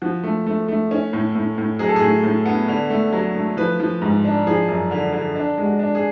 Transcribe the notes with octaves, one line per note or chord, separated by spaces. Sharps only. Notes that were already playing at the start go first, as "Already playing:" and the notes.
F3 F#4
A3
A3
A3
C#4
A2
A2
A2
F#3 G#4
A4
G#4
A2
A2
B3
D3
A3
F#3
A3
F3 B4
F3
G#2
D4
F3 G#4
F#2
D3
D3
D4
G#3
F#4
D4
G#4